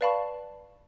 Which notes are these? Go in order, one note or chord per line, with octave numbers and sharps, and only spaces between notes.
B4 D5 F5 A5 B5 C#6